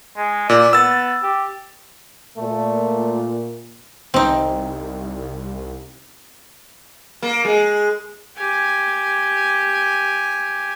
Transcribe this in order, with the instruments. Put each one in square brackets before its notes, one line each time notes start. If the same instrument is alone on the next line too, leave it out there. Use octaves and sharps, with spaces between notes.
[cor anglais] G#3
[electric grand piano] A#2 [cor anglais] D5
[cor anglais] B3 [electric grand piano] E6 A6
[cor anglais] G4
[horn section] A#2 [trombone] A3
[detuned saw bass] C2 [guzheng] C4 D#4
[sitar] A#3
G#3
[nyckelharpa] G4 G#5